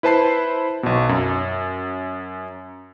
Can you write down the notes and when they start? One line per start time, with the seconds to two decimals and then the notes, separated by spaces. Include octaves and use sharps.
0.03 E4 B4 C5 A5 B5 C7
0.83 B1 B2
1.09 F#2